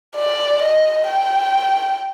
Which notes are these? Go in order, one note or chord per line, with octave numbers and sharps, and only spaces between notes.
D5
D#5
G5